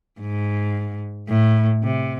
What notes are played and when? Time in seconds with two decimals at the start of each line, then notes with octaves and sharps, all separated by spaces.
0.21 G#2
1.29 A2
1.83 C3